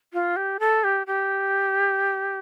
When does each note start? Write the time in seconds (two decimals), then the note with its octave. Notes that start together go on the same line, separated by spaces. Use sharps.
0.13 F4
0.36 G4
0.60 A4
0.84 G4
1.07 G4